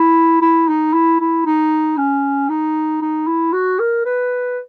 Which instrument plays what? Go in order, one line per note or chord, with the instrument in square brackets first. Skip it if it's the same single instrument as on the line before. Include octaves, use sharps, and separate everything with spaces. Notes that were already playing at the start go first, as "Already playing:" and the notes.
Already playing: [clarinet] E4
E4
D#4
E4
E4
D#4
C#4
D#4
D#4
E4
F#4
A#4
B4